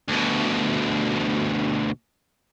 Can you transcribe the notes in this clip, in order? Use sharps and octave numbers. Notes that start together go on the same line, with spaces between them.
D2 B2